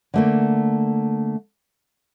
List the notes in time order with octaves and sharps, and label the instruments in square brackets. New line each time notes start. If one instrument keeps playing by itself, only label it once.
[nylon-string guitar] D3 A3 A#3